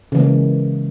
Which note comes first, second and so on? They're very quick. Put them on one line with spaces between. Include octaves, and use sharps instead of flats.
C#3 E3 A#3 G#3